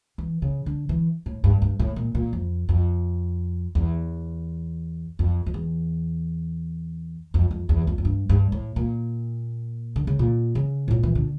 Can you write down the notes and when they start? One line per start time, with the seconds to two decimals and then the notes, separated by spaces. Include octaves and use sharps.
0.18 E3
0.42 C#3
0.66 D3
0.89 E3
1.26 A2
1.44 G2
1.62 G2
1.80 A2
1.96 A#2
2.15 A#2
2.33 F2
2.69 F2
3.75 E2
5.19 F2
5.46 F2
5.54 E2
7.34 F2
7.51 F2
7.69 E2
7.87 F2
7.98 F2
8.05 G2
8.29 G2
8.52 A2
8.76 A#2
9.96 D3
10.07 C#3
10.19 A#2
10.55 C#3
10.88 A2
10.91 A#2
11.03 E3
11.15 D3